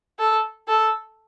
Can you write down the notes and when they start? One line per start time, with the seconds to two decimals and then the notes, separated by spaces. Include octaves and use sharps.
0.19 A4
0.68 A4